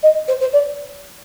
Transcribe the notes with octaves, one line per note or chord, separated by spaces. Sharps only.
D#5
C5
C5
D5